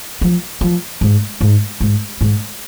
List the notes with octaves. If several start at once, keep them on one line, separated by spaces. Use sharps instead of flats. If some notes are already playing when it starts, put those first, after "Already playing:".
F3
F3
G#2
G#2
G#2
G#2